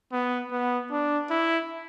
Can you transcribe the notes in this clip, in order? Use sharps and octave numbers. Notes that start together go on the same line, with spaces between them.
B3
B3
D4
E4